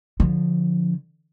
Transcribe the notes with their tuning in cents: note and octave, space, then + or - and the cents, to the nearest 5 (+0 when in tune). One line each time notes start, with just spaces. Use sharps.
D3 +0 F3 +10